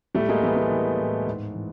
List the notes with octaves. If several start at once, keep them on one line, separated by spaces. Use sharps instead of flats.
A2 G3 A3
G#3 A#3
E3 A3 B3
G#3
E3
A2
G#2
E3